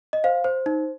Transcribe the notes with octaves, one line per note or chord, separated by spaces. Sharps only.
D#5
C5 F5
C5
D#4